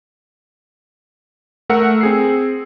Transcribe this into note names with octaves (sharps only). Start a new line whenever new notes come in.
A3 A#4 F#5 E6 C#7
C4 G#4 C7